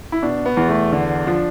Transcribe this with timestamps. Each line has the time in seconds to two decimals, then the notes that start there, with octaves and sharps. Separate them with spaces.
0.12 E4
0.22 B2 D4
0.46 B3
0.57 E2
0.69 A3
0.92 D3
1.27 F3 D4